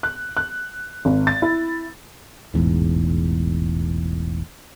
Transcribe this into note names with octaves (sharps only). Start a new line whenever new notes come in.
F#6
F#6
G#1
A6
E4
E1 A1 E2 G#2